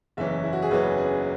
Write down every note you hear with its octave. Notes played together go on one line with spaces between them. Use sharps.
F#1 E2 E3 C#4 E5
E4
F#4
G#4
F#1 E2 E3 C#4 B4
G#4